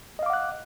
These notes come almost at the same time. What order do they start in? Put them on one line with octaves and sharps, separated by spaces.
D#5 F5 D6 F#5 F#6